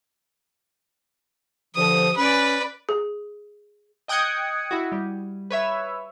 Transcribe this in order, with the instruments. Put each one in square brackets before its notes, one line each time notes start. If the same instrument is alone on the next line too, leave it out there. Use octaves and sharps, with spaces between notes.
[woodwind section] G2 D3 F3 [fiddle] D#6
[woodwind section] C#4 [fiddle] B4 D5
[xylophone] G#4
[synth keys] D#5 G5 D#6 F#6 G#6 C#7
E4 F#4
G3
B4 C#5 E5